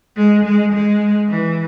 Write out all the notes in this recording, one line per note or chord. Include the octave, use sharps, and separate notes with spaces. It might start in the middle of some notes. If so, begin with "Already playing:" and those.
G#3
G#3
G#3
E3